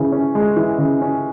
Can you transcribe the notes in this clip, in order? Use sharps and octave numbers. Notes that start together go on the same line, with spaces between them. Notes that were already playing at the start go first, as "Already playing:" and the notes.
Already playing: C#3 E3
C#4
G#3
E3
C#3
C#4